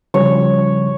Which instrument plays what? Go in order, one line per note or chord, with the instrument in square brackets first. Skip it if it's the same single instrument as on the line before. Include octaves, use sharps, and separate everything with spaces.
[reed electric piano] C#3 F3 G3 [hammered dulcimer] C#5